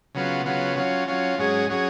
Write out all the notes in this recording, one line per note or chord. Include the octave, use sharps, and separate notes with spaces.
C#3 F#3 B3 F4
C#3 F#3 B3 F4
F#3 C#4 F4
F#3 C#4 F4
G#2 F#3 C#4 G#4
F#3 C#4 G#4